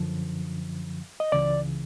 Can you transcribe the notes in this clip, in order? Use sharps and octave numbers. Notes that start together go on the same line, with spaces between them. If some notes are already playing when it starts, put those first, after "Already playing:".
Already playing: F#2 D3 F3
D#5
C#2 C#3 E3 D5